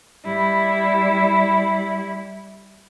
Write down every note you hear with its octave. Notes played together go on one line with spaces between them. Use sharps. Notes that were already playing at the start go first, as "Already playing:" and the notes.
G3 E4